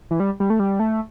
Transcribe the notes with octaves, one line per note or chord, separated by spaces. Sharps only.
E3
G3
G3
A3
G3
A3